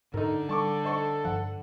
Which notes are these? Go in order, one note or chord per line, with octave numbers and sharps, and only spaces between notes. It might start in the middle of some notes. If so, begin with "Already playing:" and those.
G#2 D3 D#4 A4 A#4
G3 A4 A5 C#6 D6
C5 D#5 C#6
G2 F3 F#5